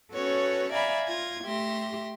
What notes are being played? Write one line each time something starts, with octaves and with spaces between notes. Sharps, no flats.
C#4 F#4 A4 B4 C#5
D5 E5 F5 G#5 A#5 B5
F4 G#6 A#6
A3 G4 E5 C6 A#6